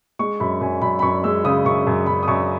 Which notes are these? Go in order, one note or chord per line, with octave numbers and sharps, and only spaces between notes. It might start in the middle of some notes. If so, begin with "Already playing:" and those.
G#3 C#6
F#2 B5
F#2 G#5
F#2 B5
B5
F#2 C#6
G#3 E6
C#3 D#6
F#2 C#6
F#2
F#2 B5
D#6
F#2 C#6